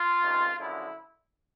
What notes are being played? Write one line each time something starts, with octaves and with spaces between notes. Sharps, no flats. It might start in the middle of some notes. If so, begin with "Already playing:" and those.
Already playing: F4
C#2 C3 D#3
F#2 D3 F3 G#3 E4